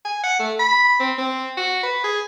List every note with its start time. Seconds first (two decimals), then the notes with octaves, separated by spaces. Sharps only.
0.05 G#5
0.24 F#5
0.39 A3
0.59 B5
1.00 C4
1.18 C4
1.57 F#4
1.83 B4
2.04 G#4